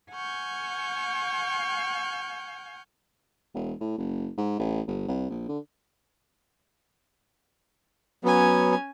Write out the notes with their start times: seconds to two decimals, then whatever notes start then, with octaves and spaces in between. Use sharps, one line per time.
0.11 F#5 G#5 C#6 F6 G6
3.54 E1
3.80 A2
3.98 F#1
4.37 G#2
4.59 A1
4.87 G1
5.08 C2
5.30 A#1
5.49 D3
8.24 F#3 B3 C#4 G#5